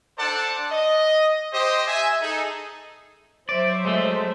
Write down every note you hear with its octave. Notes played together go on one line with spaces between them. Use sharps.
D4 A4 C5 D5 F#5 A5
D#5
G4 C5 D#5
E5 G#5
D#4 G#4 A4
F#3 C5 D5 E5
G#3 A3